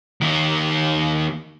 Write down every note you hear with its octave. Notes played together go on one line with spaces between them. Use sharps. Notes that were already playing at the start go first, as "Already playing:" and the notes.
D#2 D#4